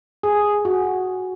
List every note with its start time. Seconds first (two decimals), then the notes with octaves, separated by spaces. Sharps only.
0.23 G#4
0.65 F#4